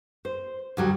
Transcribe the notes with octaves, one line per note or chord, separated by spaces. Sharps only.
C5
D2 F#3 G3